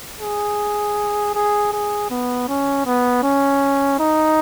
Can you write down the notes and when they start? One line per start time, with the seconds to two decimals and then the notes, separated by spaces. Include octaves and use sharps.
0.21 G#4
1.35 G#4
1.73 G#4
2.10 B3
2.48 C#4
2.86 B3
3.23 C#4
3.99 D#4